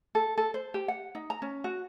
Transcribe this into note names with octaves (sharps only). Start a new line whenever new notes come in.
A4
A4
C5
G4
F#5
D#4
A#5
C#4
F#4